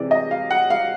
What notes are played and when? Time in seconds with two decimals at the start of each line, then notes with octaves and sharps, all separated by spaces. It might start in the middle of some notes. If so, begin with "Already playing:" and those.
Already playing: C3 E3 G#3 D5
0.11 D#5
0.31 F5
0.51 F#5
0.70 F5